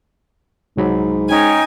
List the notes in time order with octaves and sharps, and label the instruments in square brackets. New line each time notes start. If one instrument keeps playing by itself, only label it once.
[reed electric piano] C2 F#3 B5 [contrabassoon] G#2
[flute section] C#4 D#4 G5 [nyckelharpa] G#5